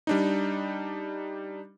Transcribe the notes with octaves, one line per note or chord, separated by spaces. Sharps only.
G3 D4 D#4